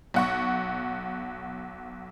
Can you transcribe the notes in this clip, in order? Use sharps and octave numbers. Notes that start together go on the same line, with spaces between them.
B1 F#5 C#6